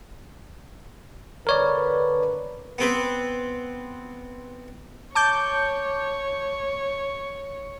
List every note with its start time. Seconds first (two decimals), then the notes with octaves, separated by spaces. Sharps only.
1.47 D3 A#4 B4 C#5 D5
2.78 B3 C4 B4
5.15 C#5 A5 D6 G6